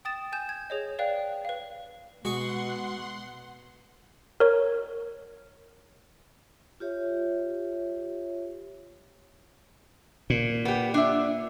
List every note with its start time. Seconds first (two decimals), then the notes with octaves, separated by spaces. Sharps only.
0.05 G5 D#6 A6 E7
0.32 G#5 G6 E7
0.49 G#6
0.70 G#4 C#5 D#5
0.99 B4 D5 F5 G5 F#6
1.45 B4 F5
2.25 B2 G#3 F#4 G#4 F#5 C6 C#6
4.40 A#4 C#5
6.80 F4 G4 C#5 E5
10.30 A#2
10.65 B3 G4
10.94 D4 E5